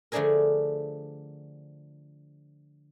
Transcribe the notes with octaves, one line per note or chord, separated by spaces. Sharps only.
D3 F3 A3 D4 G#4 A#4